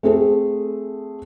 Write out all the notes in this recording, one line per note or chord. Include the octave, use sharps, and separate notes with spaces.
A3 C4 G#4 A4